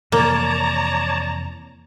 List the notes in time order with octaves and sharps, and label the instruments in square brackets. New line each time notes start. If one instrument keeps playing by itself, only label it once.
[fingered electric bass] F2 C3 E3 [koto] A#3 [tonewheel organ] C#5 D5 A5 [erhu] A#5